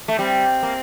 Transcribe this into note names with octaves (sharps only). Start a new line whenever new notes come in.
A3
G3 C4
A#3